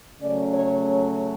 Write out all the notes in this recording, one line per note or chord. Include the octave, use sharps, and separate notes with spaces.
C#3 F#3 A3 C#4 D5
C#5